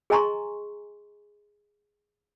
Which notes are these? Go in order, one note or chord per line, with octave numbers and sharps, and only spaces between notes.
G#4 D#5 G#5 A#5 C6 C#6